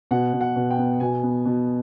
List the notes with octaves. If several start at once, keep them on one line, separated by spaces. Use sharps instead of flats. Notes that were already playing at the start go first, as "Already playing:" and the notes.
B2 F#5
B2
F#5
B2
G5
B3
B2 G#5
B3
B2